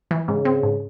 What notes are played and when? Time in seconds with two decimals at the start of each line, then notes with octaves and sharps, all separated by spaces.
0.11 E3
0.28 G#2 C#3
0.45 C4
0.63 G#2